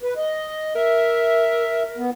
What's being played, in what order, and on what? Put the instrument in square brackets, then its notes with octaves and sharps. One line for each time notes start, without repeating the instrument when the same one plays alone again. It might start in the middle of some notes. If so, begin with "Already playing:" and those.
[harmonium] B4
D#5
[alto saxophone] A#4 [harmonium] E5
[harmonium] B3